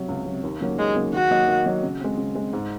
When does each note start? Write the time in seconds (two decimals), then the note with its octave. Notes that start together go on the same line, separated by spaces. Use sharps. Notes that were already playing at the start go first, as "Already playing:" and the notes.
Already playing: C3 F#3
0.08 C#2
0.26 C3 F#3
0.43 D#2
0.61 C#3 F#3 A#3
0.78 D#2 G#3
0.96 C#3 F#3 A#3
1.13 D#3 F#4
1.31 F#3 A#3 D#4
1.48 D#3
1.66 F#3 A#3 D#4
1.83 C#3
2.00 G#3 C4
2.18 C#3
2.35 G#3 C4
2.53 G#2